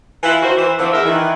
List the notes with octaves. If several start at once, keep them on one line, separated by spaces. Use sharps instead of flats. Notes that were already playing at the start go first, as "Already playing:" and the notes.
E3 E4 F4
D#3 F#4 C5
E3 C5
D3 E3 F3 C4
E2 A#4 E5
D#3 E3